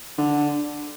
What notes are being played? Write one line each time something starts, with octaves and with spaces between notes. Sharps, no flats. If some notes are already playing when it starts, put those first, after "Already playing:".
D3